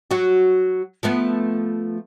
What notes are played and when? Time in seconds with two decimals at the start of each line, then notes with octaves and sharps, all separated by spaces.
0.11 F#3 F#4
1.03 F3 A3 B3